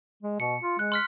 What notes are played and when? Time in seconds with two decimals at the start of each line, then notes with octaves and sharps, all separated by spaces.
0.23 G#3
0.40 B2 C#7
0.62 F4
0.79 G#3 F#6
0.92 C6 F6 B6